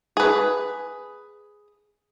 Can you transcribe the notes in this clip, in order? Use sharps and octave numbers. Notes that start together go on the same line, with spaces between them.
G#4 B4